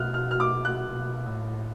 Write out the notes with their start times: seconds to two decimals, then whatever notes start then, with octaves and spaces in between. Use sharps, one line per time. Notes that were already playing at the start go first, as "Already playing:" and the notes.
Already playing: B2 F6 F#6
0.14 F6
0.31 F6
0.40 D6
0.65 F#6
0.89 B2
1.26 A2